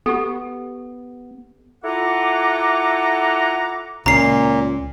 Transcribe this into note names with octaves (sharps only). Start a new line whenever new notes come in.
B3 G4 A4
E4 F4 A4 F#5 A#5 D6
C#2 A#2 C#3 A#5 C7